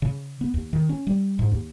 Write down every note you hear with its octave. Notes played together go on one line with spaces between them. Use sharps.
C#3
B3
D#2
D#3
C#4
G3
G#2
D#2